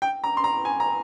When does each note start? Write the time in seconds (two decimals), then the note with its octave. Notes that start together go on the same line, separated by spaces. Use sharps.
0.02 G5
0.24 A#5
0.37 C6
0.44 A#5
0.65 G#5
0.80 A#5